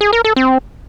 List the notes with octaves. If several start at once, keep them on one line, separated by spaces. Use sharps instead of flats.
G#4
A#4
A4
C4